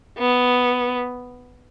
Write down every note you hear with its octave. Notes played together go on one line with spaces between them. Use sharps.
B3